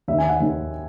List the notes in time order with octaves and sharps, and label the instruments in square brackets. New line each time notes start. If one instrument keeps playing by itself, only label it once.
[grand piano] D#2 D#3 E5
G#5
F#5
D#2 D#3